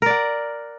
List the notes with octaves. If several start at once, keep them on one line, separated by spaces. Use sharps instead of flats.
A#4 D5 F#5